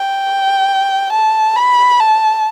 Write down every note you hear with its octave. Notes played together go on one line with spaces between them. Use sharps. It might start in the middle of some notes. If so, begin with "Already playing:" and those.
Already playing: G5
A5
B5
A5